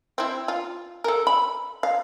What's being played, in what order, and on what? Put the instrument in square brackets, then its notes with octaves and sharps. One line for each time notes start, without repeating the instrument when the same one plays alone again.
[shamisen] C4 E4
F4
A4 A#4
B5
F5